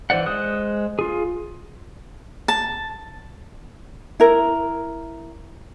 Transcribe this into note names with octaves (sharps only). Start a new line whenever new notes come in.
E3 C5 D5 F#5
G#3 C5 D#6 F#6
F4 G#4
A5
E4 A#4